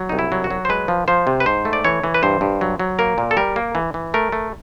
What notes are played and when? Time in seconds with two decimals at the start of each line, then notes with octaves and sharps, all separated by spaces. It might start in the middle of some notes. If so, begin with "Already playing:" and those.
Already playing: F#3
0.09 C2 D#4
0.19 E4
0.32 F#3
0.44 F#4
0.51 F#3
0.65 C5
0.69 G#3 B4
0.88 F3
1.08 F3 C5
1.27 C3
1.40 B4
1.46 G#2 C5
1.65 A3
1.73 D5
1.84 E3 C#5
2.04 E3
2.14 B4
2.23 G2 C5
2.41 G2
2.61 F#3
2.80 F#3
2.99 A#3 A#4
3.18 A#2
3.31 A4
3.37 G3 A#4
3.56 A#3
3.75 E3
3.94 E3
4.14 A3 A#4
4.32 A3